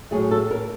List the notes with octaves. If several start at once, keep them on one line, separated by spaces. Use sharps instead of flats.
A2 F#3 A3 G#4
A4
A#4